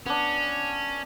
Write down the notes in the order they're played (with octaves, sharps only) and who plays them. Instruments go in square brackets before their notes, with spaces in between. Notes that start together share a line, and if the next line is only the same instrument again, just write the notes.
[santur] B3 D4 [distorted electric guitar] C#4